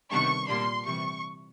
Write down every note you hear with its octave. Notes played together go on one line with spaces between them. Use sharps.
C3 D#3 G3 B3 D4 C#6
A#2 G3 A#3 D4 C6
C3 E3 G3 C#6